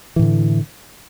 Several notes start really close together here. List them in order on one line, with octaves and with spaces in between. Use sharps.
E3 A2 D3